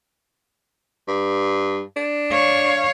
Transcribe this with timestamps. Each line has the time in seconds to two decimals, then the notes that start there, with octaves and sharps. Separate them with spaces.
1.08 G2
1.97 D4
2.32 C#5 F5